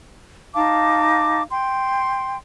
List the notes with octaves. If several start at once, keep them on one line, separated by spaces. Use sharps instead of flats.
D#4 F5 A5 D6
G5 C6